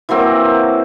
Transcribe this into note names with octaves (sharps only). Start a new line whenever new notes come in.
E3 F#3 A#3 C4